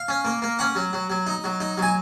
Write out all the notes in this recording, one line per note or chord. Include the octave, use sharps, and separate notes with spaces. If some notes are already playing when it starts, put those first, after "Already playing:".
Already playing: F5
C#4
A#3
A#3
C#4 F#5
F#3
F#3
F#3
D#4
F#3
D#4
F#3 G#5